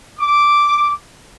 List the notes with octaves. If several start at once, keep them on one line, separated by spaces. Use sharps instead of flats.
D6